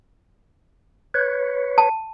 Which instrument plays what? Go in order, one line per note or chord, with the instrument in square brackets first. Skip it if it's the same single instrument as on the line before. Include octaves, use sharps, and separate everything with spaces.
[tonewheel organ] B4 C#5
[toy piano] A5